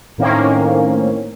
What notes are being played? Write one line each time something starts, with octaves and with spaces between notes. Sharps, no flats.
A2 D#3 A#3 C4 C#4